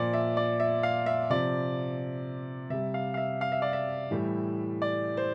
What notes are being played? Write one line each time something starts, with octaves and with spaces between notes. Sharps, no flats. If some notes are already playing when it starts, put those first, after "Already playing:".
Already playing: A#2 F3 D5
E5
D5
E5
F5
E5
C3 F3 D5
C3 G3 E5
F5
F5
E5
F5
E5
D5
E5
A2 E3 G3
D5
C5